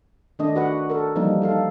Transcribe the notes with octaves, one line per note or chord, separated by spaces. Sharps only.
D#3 A3 D4 D#5
F#4 B4 F#5
A4 A#4
E3 F3 G3 A#3 D#4
D#4 A4 F5